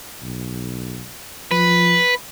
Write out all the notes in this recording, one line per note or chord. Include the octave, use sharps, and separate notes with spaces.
B1
F3 B4